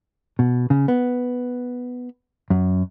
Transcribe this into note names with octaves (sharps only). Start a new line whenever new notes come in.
B2
C#3
B3
F#2